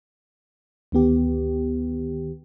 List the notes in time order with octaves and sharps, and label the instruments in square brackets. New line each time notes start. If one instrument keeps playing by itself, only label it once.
[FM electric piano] D2 D#3 B3 G4